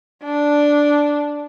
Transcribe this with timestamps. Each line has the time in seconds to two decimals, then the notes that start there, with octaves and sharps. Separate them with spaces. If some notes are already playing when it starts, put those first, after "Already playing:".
0.24 D4